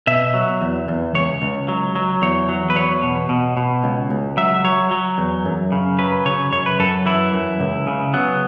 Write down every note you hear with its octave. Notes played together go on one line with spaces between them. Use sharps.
B2 E5
F#3
E2
E2
C#2 C#5
C#2
F#3
F#3
E2 C#5
F#3
B4
E2 C#5
B2
B2
B2
C#2
C#2
F#3 E5
F#3 C#5
F#3
E2
F#2
C#3
F#3 B4
C#3 C#5
F#2 C#5
B4
F#2 A4
E3 E4
F#2
C#2
C#3
F#3 B3